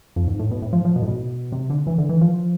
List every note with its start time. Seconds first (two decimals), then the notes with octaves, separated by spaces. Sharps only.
0.16 F2
0.28 G#2
0.39 A2
0.51 B2
0.62 A2
0.73 F3
0.85 F3
0.96 B2
1.02 A2
1.08 B2
1.52 C3
1.70 D3
1.87 E3
1.98 D3
2.09 E3
2.21 F3